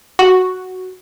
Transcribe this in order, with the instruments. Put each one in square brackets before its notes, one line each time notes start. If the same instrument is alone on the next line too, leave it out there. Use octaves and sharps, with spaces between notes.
[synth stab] F#4